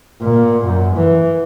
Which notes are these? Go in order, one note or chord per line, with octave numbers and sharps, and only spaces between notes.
A#2
F#2
E3